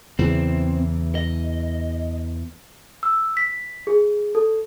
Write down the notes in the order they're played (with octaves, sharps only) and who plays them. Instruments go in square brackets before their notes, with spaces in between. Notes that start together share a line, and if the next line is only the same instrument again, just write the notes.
[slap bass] E2 C#3 E3 [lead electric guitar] C4
[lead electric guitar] D#5
[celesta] E6
B6
G#4
A4